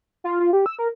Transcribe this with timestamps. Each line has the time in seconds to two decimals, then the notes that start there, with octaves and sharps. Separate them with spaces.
0.24 F4
0.40 F4
0.53 G4
0.66 E6
0.79 A#4